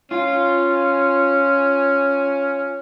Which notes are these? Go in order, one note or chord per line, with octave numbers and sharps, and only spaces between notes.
C#4 F4